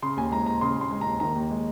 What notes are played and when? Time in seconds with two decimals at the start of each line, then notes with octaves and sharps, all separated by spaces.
0.02 C#3 C6
0.17 D#2 G#5
0.32 G#3 A#5
0.46 D#2 A#5
0.61 C#3 C6
0.76 D#2
0.81 C6
0.91 G#3
1.01 D#2 A#5
1.20 D#3 A#5
1.35 D#2
1.50 G#3